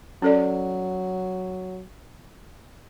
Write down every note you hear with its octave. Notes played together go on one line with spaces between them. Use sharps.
F#3 C#4 A4 D5